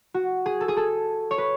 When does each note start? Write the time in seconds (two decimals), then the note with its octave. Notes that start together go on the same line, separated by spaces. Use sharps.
0.14 F#4
0.46 G#4
0.61 A4
0.68 G#4
0.77 A4
1.31 C#5
1.38 B4